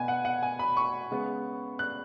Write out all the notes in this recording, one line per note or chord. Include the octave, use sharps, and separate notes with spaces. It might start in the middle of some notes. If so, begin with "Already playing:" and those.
Already playing: B2 B3 G#5
F#5
F#5
G#5
B5
C#6
C#3 G#3 B3
F#6